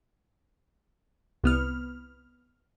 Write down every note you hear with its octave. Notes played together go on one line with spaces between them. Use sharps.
C2 B3 F6